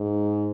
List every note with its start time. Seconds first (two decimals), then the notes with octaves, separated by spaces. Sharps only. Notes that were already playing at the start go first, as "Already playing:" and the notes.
Already playing: G#2